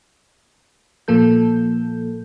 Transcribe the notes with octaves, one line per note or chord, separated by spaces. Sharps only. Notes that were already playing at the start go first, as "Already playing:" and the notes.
A#2 F3 A#3 A4 G6